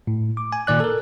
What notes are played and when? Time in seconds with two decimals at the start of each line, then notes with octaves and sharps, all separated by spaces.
0.07 A2
0.37 D6
0.52 G#5
0.67 A#2 D#3 D5 F#6
0.80 A4 A#4